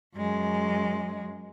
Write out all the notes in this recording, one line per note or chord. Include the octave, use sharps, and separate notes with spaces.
F#2 G#3